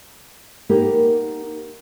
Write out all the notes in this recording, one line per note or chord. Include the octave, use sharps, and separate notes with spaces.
A#3 B3 D#4 G4 A#4